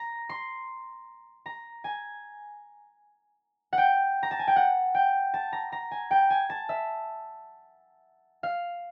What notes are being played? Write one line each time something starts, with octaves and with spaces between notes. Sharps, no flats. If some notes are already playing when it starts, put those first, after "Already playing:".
Already playing: A#5
C6
A#5
G#5
F#5
G5
A#5
A5
G#5
G5
F#5
G5
A5
A#5
A#5
G#5
G5
G#5
A5
E5
F5